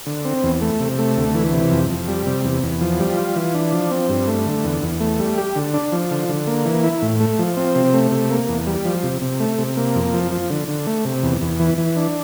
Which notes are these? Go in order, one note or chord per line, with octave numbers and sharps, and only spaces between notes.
D3
C4
E2
A3
C3
A3
D2
E3
C3
F2
F2
G3
C3
E2
E2
F3
G3
F4
E3
D4
F3
C4
G2
A3
D3
E2
E2
A3
G3
G4
D3
D4
F3
D3
D3
A#3
E3
E4
A2
A3
F3
C4
C3
A3
C3
A#3
E2
G3
F3
C3
C3
A3
C3
A#3
F2
F3
F3
D3
D3
A3
C3
E2
E2
E3
E3
D4